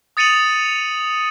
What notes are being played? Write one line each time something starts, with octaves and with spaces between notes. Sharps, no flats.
D#6 A6 C#7 D#7 F7 F#7